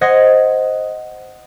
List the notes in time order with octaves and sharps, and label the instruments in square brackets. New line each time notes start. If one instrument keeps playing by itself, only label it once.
[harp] C5 D#5 F#5 D#6 G#6 A#6